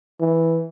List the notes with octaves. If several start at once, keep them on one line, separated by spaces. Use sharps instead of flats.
E3